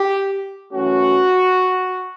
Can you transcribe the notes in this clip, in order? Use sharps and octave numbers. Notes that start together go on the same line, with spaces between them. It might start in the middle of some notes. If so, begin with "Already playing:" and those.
Already playing: G4
F#2 E3 A3 C#4 F#4